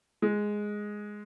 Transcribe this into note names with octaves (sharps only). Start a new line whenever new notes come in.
G#3